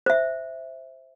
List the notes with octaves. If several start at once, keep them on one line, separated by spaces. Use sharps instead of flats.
C5 E5